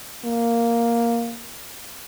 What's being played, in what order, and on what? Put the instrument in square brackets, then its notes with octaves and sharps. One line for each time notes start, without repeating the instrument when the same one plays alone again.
[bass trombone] A#3